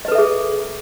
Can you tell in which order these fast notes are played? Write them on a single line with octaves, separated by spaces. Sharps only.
D#5 B4 A4 E5 G#4